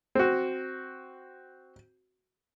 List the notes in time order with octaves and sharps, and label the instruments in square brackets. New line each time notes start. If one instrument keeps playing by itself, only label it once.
[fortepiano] C4 F#4